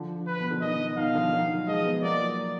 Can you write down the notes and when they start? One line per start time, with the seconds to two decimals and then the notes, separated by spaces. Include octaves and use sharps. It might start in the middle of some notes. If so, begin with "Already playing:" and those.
Already playing: D3 F3
0.27 B4
0.40 B2
0.51 D3
0.61 B2 D#3 D#5
0.97 B2 D#3 F5
1.15 D3 F3
1.33 D#3 F#3
1.67 F3 G#3 D#5
1.85 G#3 B3
2.03 F#3 A#3 D5